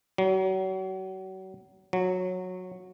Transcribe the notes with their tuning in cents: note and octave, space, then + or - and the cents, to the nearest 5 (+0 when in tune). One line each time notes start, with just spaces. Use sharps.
F#3 +35
F#3 -15